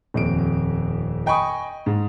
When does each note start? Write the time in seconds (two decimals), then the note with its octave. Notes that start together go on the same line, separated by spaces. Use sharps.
0.14 D#1 F2 D7
1.26 D#5 G5 G#5 B5 C#6 D#6
1.86 G#2